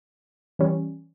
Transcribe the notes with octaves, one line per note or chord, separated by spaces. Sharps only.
E3 G3 C#4